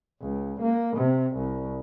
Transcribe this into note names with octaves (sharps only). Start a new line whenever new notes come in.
C#2
A#3
C3
C2